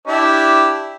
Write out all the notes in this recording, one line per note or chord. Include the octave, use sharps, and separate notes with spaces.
D4 E4 G4